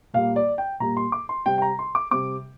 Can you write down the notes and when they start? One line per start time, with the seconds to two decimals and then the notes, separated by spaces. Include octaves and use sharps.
0.14 A#2 G3 A#3 F5
0.36 D5
0.58 G5
0.80 A#2 G3 A#3 A#5
0.97 C6
1.12 D6
1.29 C6
1.46 C3 G3 C4 G5
1.58 G5
1.62 A#5
1.79 C6
1.95 D6
2.11 C3 G3 C4 D6